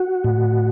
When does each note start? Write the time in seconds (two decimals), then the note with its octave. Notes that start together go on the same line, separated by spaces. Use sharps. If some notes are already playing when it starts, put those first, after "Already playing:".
Already playing: F#4
0.24 A2